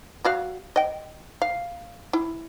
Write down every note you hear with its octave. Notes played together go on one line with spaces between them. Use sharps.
G3 F#4 F5
D#5 G5
F5
E4